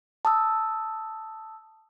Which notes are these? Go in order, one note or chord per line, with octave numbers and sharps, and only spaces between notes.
A5 D#6 E6